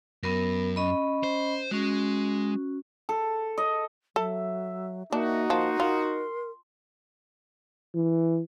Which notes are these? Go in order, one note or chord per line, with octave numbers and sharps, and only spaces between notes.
F#2 B3 A#4
C#4 D#5 B5
C5
G#3 C#4 F#4
A4
D#5
F#3 A4 E5
A#3 D4 D#4 F#4 E5
F3 A#3 C6
F4 A#4
E3